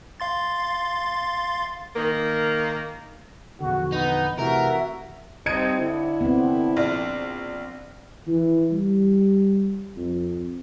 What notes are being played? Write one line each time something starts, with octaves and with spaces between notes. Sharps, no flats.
F5 C6 A6
D#3 A#3
A#1 E2 D3 F#4
B3 D#4
C3 E3 A3 F#4 A#4 E5
G2 C4 D#4 D#5 G#6 C#7 D#7
D3 E4
B3 C4
A#1
E3
G3
F2